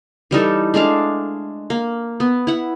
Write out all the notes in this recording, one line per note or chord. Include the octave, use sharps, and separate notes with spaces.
E3 G3 D#4 A4
G#3 A3 D4 F5
A#3
B3
E4 F#5